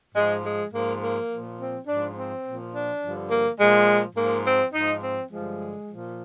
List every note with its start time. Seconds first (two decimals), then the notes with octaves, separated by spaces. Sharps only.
0.15 G#2 F3 G#3
0.44 G#3
0.72 G#2 F3 A#3
1.02 A#3
1.29 A#2 F3
1.58 C4
1.87 G#2 F3 D4
2.15 C4
2.44 A#2 F3
2.73 D4
3.02 G2 D3 F3
3.29 A#3
3.59 A#2 F3 G#3
4.16 G#2 F3 A#3
4.44 C4
4.73 G#2 F3 D#4
5.02 C4
5.30 G2 D3 F3 G#3
5.87 F3
5.93 A#2